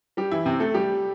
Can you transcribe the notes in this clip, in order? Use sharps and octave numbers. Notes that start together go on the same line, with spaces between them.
G3 G4
E3 E4
C3 C4
A3 A4
G3 G4